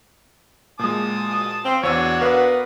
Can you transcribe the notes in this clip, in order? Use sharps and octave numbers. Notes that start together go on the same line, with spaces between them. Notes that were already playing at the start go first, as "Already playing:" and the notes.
A#2 G#3 A5 D#6
C4 C5 F5
E2 D4 F#4 C#5 E6 D#7
B3 A#4 B4 F5